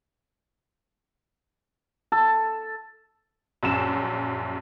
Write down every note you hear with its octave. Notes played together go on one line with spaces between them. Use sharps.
A4
A#1 F#2 E7